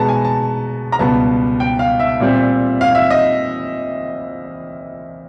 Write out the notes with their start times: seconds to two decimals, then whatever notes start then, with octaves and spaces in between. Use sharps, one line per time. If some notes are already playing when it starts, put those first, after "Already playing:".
Already playing: B2 G#3 B3 A5 A#5
0.09 G#5
0.25 A5
0.92 A#5
0.99 C#2 B2 G3 B3 A5
1.60 G5
1.79 F5
2.00 E5
2.20 A#2 G3 C4
2.81 F5
2.95 E5
3.10 D#5